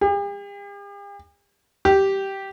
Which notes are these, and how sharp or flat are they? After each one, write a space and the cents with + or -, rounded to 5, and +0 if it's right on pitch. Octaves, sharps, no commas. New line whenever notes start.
G4 +45
G4 -10